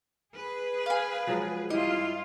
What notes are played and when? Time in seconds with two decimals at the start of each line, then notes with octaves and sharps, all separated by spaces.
0.34 G#4 B4
0.86 F5 G#5
1.27 F3 F#3 G#3
1.70 G2 E4 F4 G4 D#5